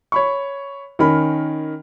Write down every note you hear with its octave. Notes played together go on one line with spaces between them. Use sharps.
C#5 B5 C#6
D#3 C#4 A#4 B5